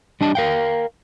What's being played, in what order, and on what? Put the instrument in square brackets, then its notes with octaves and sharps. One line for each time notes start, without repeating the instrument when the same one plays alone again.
[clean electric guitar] G3 D4 D#5 A5
A#4 F5 G5